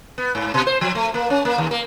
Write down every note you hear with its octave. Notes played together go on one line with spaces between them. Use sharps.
B3
G#2
B2
C5
F3
A3
A#3
C#4
A#3
D#2
A#3